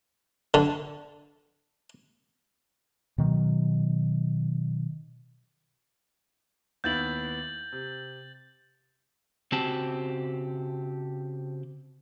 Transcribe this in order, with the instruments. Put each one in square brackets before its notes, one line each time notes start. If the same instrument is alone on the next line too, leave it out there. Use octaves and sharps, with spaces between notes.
[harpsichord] D3
[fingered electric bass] B2 D#3 F#3
[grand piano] D#2 B3 E4 [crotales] G6 A6 F#7
[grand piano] C3
[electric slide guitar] C#3 C4 F#4 G4 A5